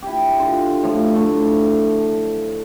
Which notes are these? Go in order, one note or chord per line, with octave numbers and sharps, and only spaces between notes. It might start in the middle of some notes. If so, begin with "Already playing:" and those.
E4 G4
D3 F4
A2 F3 F#3 F5
A3 D4